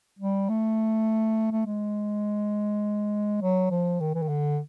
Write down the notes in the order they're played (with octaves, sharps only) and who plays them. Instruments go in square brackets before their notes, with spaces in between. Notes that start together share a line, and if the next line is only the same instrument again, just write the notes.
[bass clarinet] G3
A3
A3
G#3
F#3
F3
D#3
E3
D#3
D3